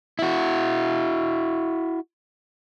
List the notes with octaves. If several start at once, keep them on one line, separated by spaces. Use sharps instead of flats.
E4 F#4